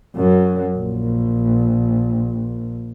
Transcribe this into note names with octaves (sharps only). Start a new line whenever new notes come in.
F#2
A#1